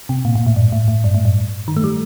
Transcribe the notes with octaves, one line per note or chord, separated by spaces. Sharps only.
C3
A#2
A#2
A2
G2
A2
A2
G2
A2
G2
D#3
A3
G3